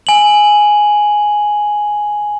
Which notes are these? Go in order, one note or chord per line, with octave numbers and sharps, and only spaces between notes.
G#5 F#7